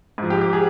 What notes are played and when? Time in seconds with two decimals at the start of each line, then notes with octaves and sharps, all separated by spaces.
0.18 G#2 F3
0.30 G4
0.41 G4
0.53 G#4